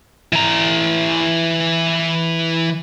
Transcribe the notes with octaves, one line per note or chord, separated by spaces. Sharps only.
E3 A#5